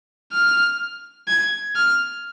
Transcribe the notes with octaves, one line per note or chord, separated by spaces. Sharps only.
F6
G#6
F6